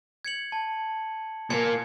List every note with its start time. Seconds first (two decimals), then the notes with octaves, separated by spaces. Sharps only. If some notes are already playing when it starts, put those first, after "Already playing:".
0.25 G#6 C#7 F#7
0.52 A5
1.50 A#2 A#3 G#5 G#6 C#7